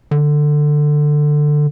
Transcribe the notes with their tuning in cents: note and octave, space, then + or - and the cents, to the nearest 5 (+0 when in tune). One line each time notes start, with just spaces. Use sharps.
D3 +15